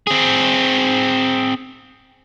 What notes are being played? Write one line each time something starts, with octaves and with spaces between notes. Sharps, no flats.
C4 G#4